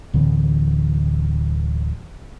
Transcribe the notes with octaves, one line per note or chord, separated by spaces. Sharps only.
D1 D3 E3 C4